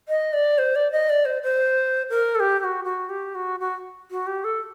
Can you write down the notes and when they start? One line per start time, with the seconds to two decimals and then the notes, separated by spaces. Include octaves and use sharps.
0.08 D#5
0.33 D5
0.58 C5
0.75 D5
0.92 D#5
1.09 D5
1.25 C5
1.43 C5
2.10 A#4
2.35 A4
2.40 G4
2.59 G4
2.64 F#4
2.84 F#4
3.09 G4
3.35 F#4
3.60 F#4
4.11 F#4
4.27 G4
4.44 A4